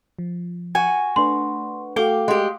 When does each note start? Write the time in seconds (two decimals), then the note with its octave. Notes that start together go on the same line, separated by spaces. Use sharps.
0.19 F3
0.75 F#4 G#5
1.16 A3 D4 B4 C6
1.96 A3 F#4 A4 F5 G5 D6
2.28 G#3 G4